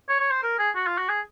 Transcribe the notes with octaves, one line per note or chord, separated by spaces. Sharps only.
C#5
C#5
C5
A#4
G#4
F#4
F4
F#4
G#4